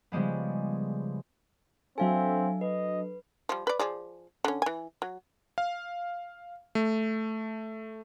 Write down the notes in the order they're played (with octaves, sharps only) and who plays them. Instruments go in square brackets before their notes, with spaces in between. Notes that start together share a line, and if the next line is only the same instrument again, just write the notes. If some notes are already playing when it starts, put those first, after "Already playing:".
[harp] C#3 F3 G3 G#3 B3
[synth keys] F#3 D4 A4 [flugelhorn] C4 [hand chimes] E5 F5 G#5
[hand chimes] B4 [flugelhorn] D#5
[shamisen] F3 G3
B4 D5
F3 G#4 D5
D3 C#4
E3 G#5
F#3
[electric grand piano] F5
A3